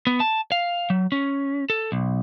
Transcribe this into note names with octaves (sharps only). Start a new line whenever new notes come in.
B3
A5
F5
F#3
C#4
A4
B1